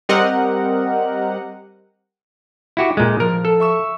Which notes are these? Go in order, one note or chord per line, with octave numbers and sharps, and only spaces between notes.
G3 C4 G4 A#4 D#5 F#5
E4 F#4 G4
A#2 G#3
F3 A#4
A4
E5 C#6 E6